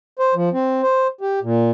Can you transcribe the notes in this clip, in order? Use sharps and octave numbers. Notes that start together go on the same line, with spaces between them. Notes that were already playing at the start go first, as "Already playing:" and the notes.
C5
F3
C4
C5
G4
A#2